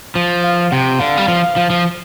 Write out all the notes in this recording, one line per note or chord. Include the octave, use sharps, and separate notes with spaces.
F3
F5
C3 G5
D3 F5
G3
F3
F3
F3